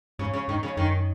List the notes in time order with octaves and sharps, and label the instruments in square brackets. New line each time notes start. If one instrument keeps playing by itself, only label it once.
[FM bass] G#2 [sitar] C#3
[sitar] C#3
[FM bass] G#2 [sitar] D#3
[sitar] C#3
[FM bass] F#2 [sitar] D#3